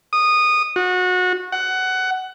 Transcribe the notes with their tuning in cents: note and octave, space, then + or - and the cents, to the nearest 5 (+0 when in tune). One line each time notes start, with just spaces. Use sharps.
D#6 -15
F#4 -25
F#5 +15